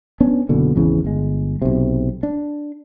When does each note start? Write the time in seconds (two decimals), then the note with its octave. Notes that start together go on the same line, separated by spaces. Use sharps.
0.20 B3 C#4 D4
0.49 F#1 B2 D3
0.76 G#1 E2 C#3 E3
1.05 G1 G#3
1.62 B1 C3
2.23 D4